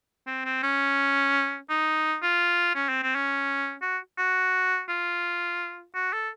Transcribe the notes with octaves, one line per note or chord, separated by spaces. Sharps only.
C4
C4
C#4
D#4
F4
C#4
C4
C4
C#4
F#4
F#4
F4
F#4
A4